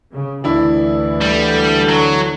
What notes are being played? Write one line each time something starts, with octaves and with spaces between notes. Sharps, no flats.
C#3
D2 E3 D4 E4 D5
D3 G3
F#3